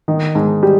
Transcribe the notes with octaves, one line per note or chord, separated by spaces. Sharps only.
D#3
G#2
G3